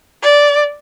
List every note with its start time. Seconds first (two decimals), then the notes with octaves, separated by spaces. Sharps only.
0.23 D5